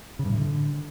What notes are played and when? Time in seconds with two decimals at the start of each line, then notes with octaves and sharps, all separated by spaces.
0.19 C#3
0.25 G2
0.31 A2
0.37 D3